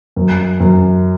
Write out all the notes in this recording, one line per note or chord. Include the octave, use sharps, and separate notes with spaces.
F#2
F#2